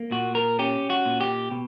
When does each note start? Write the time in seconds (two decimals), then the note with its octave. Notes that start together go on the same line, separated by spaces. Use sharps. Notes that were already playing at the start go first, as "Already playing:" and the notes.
Already playing: A#3
0.11 A#2 F#4
0.35 A#4
0.59 C#4 G4
0.90 F#4
1.05 A#2
1.21 G4
1.51 B2